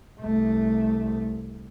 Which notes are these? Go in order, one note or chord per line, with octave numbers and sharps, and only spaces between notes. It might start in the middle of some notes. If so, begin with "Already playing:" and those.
C2 A3